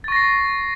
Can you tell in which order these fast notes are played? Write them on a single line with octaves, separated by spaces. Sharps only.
A6 C#6 A#6 C7